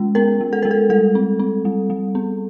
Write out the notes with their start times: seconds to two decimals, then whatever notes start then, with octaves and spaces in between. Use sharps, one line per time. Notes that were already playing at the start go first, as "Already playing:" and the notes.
Already playing: G#3 C#4
0.15 B3 A#4
0.41 G#3
0.53 A4
0.63 G#3 A#4
0.71 A4
0.90 G3 A4
1.15 C4
1.39 C4
1.65 G3
1.90 G3
2.15 B3